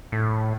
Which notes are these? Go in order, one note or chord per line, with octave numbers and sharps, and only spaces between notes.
A2